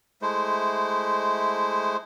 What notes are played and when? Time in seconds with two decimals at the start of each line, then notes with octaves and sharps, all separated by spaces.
0.22 G#3 A3 E4 C5